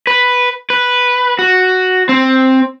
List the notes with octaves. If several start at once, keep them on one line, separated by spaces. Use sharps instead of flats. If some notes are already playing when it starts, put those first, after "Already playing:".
B4
B4
F#4
C4